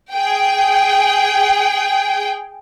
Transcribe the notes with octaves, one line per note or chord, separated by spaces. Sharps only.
G#4 G5